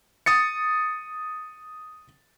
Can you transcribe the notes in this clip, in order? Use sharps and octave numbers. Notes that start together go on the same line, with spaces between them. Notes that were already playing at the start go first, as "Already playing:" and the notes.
D#6 A6 C#7